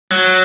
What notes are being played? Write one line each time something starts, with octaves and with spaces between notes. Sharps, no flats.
F#3